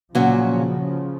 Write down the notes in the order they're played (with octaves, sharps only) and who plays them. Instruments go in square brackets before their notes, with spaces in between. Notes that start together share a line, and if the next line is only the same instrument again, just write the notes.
[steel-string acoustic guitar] A#2 F#3 C#4 F#4 [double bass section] C#3 F3